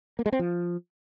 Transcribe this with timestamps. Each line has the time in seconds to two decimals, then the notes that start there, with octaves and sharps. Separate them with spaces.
0.19 A#3
0.26 G#3
0.32 C4
0.39 F3